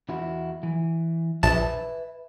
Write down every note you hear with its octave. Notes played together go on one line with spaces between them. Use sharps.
E2 E4 F#4
E3
A#1 B4 E5 A5